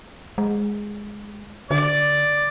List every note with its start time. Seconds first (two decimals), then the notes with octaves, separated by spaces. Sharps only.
0.38 G#3
1.71 D3 D5 D6